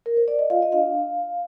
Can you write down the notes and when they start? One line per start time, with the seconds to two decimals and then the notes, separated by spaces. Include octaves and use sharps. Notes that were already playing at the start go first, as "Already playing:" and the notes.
0.06 A#4
0.17 C5
0.28 D5
0.39 D#5
0.50 F4 F5
0.62 D#5
0.72 D4 F5